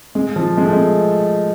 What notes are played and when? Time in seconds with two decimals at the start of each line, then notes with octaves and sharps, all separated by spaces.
0.15 G#3
0.36 F3
0.57 G#3
0.65 A3
0.73 G#3